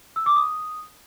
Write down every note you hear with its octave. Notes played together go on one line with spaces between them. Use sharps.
E6
D6
D#6